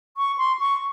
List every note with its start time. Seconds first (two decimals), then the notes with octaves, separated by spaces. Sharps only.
0.17 C#6
0.38 C6
0.59 C#6